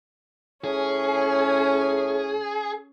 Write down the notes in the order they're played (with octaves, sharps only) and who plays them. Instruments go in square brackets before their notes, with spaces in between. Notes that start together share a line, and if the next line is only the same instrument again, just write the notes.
[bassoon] A2 [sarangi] C#4 [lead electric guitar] G#4